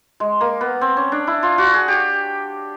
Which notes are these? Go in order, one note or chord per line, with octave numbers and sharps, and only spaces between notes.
G#3
A#3
B3
C4
C#4
D4
E4
F4
F#4
G#4
G4